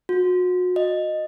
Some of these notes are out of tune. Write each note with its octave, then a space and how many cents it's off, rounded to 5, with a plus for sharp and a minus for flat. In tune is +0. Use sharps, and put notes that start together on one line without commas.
F#4 -35
D#5 -10